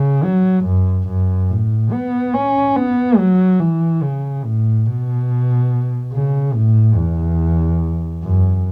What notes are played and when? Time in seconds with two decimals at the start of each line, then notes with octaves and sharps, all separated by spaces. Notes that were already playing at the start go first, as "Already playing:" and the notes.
Already playing: C#3
0.24 F#3
0.65 F#2
1.08 F#2
1.49 A2
1.92 B3
2.34 C#4
2.76 B3
3.18 F#3
3.60 E3
4.02 C#3
4.45 A2
4.86 B2
6.13 C#3
6.55 A2
6.96 E2
8.23 F#2